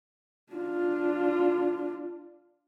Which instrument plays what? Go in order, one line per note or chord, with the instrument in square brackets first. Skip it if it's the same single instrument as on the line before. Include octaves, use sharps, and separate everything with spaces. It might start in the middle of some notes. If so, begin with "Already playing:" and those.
[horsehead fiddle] D4 F4